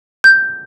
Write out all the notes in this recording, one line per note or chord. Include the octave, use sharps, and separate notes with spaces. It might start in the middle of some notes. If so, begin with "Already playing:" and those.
G6